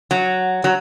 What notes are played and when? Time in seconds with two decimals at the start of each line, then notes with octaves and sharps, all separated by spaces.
0.11 F#3
0.64 F#3